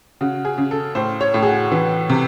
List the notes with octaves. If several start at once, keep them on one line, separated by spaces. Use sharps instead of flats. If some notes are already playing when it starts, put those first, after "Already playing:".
C#3 F#4
G#4
C#3
A4
A2 C5
C#5
A2
G#4
F#4
E3
C3